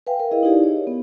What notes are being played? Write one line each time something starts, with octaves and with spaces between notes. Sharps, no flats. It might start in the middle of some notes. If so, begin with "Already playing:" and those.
B4 E5 F5 G5 G#5
A#4
E4 G#4 D#5 F5
D#4 E4 G4 G#4 D5
C#5
B3